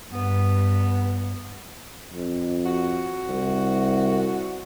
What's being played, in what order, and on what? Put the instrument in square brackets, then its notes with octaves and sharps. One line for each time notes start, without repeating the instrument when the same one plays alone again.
[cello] G2 [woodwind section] B3
[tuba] F2
[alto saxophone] F#4
[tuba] C2